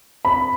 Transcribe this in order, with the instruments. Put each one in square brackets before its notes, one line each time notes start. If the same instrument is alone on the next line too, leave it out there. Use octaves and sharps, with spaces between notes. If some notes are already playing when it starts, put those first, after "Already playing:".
[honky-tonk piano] B5